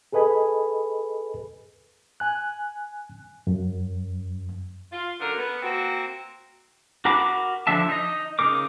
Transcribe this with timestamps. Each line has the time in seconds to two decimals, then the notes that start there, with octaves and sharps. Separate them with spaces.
0.13 G#4 A4 B4 D#5 G#5 B5
2.20 G#5 F#6
3.47 F#2
4.92 F4
5.20 F#2 D3 A#4
5.37 B3
5.62 A#3 C4 F#4
7.05 F#4 A#4 A#5 B5 D6
7.67 D3 F3 D4 E5 A5
7.89 D#4 D#5
8.39 C#3 D#4 A#4 D6